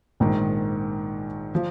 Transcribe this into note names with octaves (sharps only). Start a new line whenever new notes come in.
A#1 G#2 D#3
F3